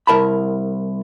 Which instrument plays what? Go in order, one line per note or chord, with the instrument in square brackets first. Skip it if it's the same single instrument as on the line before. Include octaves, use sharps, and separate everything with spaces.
[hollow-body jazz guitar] C2 A#4 A5 B5